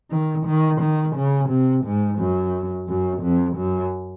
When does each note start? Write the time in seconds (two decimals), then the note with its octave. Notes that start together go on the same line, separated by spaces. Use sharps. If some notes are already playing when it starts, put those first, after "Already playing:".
0.11 D#3
0.46 D#3
0.81 D#3
1.16 C#3
1.49 C3
1.85 G#2
2.19 F#2
2.88 F#2
3.22 F2
3.57 F#2